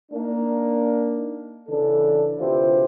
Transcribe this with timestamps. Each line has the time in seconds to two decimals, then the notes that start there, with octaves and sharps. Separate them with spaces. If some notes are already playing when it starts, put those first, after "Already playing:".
0.12 A#3 D4 D#4
1.68 C#3 E3 D4 A4
2.38 D2 C3 E3 F4 G4 C5